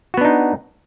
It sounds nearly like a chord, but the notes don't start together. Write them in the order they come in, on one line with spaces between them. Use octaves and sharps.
F#4 B3 D4 D#4